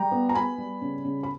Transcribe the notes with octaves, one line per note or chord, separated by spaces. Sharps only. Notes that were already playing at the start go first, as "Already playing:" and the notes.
Already playing: G3 G5 A#5
B3
A#5
B3 G#5 B5
G3
C#3
C#3
B5